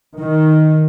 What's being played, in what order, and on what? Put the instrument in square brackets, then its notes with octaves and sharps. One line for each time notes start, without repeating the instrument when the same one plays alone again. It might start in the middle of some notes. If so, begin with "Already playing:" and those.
[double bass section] D#3